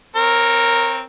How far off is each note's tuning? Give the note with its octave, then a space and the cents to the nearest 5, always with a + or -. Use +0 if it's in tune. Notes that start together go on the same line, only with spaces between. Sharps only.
C4 +0 A#4 +0 C#5 -30